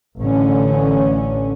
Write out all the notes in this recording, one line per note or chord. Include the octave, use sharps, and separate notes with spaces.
A1 D3 C#4